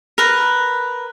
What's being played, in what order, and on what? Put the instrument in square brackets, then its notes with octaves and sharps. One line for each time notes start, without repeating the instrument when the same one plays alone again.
[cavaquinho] A#4 B4